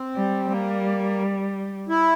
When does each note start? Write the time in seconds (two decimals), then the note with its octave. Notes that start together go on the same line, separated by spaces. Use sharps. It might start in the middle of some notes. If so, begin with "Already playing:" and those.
Already playing: C4
0.16 G3
0.50 G3 A#3
1.89 E4